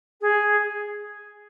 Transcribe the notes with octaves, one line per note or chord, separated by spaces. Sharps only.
G#4